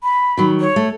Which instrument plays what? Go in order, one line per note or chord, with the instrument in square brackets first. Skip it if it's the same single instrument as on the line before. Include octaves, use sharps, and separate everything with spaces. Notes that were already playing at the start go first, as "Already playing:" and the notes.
[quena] B5
[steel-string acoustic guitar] D#3 F#3
[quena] C#5
[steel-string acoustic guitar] A3